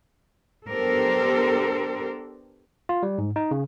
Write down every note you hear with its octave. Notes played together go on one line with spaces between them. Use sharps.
B3 D4 G4 A4 A#4 C5
F4
G3
G#2
D#4
C#3